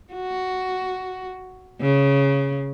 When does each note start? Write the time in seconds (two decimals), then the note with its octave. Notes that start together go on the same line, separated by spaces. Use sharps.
0.13 F#4
1.81 C#3